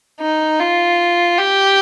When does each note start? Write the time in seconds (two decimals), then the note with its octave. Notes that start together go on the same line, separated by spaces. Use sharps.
0.20 D#4
0.60 F4
1.38 G4